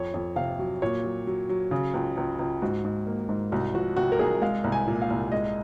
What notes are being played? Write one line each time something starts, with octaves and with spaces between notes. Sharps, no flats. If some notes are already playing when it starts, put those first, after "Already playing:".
Already playing: F2 C#5
F2
C3 F5
F#3
A#2 C#5
F#3
F#3
F#3
C#3
C#2
C#2
C#2
G#2 F#4
G#2
A#3
G#2
C2 F#4
F3 F#4
C3 F#4
A#4
C2 G#4
G#3 F5
C2
G#5
A#2
F5
C2
G#3 D#5